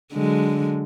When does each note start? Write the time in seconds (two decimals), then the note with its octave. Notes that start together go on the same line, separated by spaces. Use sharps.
0.13 D3 F#3 G#3